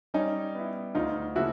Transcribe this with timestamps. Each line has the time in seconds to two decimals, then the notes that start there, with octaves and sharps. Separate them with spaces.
0.14 G3 C#4 D#4
0.55 B3 E4
0.95 D2 D#4 F4
1.35 C#3 F3 A#3 E4 F#4